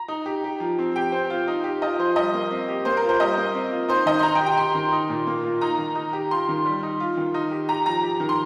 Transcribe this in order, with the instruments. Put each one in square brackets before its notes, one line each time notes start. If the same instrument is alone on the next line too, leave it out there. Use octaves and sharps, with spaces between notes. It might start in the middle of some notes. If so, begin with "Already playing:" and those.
Already playing: [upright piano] A#5
[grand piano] D#4
G4
G4
F3
C4
[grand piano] G4 [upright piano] G5
[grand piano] C4 [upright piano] C5
[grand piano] F4
D#4
G4
[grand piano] F4 [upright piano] D#5
[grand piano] F3 [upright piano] C5
[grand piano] G3 [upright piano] D#5
[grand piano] A#3
C4
G4
[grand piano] A#3 [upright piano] C5
[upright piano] A#4
[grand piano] F4
[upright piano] C5
[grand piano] G3 [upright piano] D#5
[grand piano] A#3
C4
F4
[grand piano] D#4 [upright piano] C5
[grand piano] D#3 [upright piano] D#5
[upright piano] C6
[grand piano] D#4 [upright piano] A#5
[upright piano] G5
[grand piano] G4
[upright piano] G5
[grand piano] G4 [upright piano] C6
[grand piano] D#3
D#4
A#2
A#3
F4
[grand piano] D#4 [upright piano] A#5
[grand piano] D#3
D#4
G4
[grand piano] F4 [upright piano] C6
[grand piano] D#3
G3
D#4
F4
D#3
D#4
G4
[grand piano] G4 [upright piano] A#5
[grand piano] F3 [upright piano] A#5
[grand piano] G4
D#3
[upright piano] C6